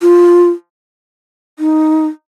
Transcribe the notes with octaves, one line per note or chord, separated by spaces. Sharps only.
F4
D#4